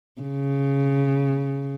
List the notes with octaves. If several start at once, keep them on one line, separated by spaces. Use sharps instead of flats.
C#3